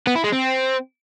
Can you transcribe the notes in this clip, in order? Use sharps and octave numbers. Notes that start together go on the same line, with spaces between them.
B3
E4
G#3
C4